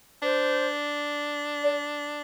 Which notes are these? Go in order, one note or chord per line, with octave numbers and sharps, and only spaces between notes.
D4 C5
D5